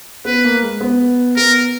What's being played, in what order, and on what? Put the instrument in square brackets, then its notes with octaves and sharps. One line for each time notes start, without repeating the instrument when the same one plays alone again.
[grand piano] B3 [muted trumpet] B4
[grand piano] A#3
G#3
B3
[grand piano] B3 [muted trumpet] A#4